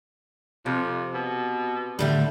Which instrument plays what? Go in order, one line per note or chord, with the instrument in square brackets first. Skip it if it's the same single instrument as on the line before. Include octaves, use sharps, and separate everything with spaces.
[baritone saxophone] F2 [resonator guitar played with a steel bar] C3
[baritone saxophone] B2
[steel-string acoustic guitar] A2 D3 A3 [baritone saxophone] G3